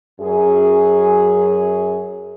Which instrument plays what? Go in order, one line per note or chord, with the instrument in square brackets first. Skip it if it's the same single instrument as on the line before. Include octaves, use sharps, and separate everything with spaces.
[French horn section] F#2 G#4